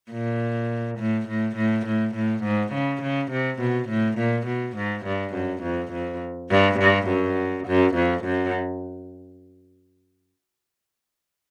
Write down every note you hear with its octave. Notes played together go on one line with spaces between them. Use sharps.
A#2
A2
A2
A2
A2
A2
G#2
C#3
C#3
C3
B2
A2
A#2
B2
G#2
G2
F#2
F2
F2
G2
G2
F#2
F#2
F2
F#2